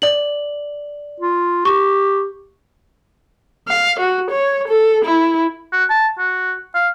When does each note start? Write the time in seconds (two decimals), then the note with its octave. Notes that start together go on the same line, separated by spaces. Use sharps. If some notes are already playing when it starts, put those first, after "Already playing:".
0.02 D5 F#7
1.20 F4
1.65 G4 C#6
3.68 F5
4.00 F#4
4.30 C#5
4.68 A4
5.05 E4
5.72 F#4
5.89 A5
6.18 F#4
6.74 F5